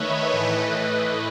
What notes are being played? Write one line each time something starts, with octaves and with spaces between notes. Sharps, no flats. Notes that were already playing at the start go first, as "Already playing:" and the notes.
Already playing: D#3 A3 B4 C#5 D#5 E5
A2 E3 A3